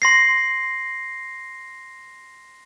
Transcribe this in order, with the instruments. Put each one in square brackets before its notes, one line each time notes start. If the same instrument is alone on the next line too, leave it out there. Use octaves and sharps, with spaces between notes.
[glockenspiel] C6 A#6 C7